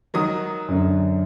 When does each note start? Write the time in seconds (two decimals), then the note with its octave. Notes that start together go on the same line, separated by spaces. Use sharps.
0.14 D#3 F#3 D#6
0.68 F#2 D3